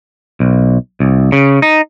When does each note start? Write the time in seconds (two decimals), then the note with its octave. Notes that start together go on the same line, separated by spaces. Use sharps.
0.40 B1
1.00 C2
1.32 C#3
1.62 D#4